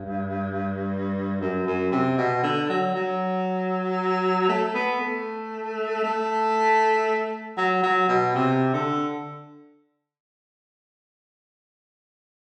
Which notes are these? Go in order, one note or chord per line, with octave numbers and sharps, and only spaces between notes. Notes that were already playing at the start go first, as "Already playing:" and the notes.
Already playing: G2
F#2
F#2
C3
B2
D3
F#3
F#3
A3
B3
A3
A3
F#3
F#3
B2
C3
D3